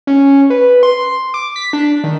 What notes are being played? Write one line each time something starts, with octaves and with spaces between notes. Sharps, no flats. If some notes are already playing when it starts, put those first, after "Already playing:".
C#4
B4
C6
D6
B6
D4
D#3